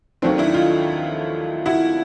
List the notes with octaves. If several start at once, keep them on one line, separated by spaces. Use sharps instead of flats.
D#2 D#3 F#3 A3 C4 D4
D4 E4
D#4 F4
E4 F#4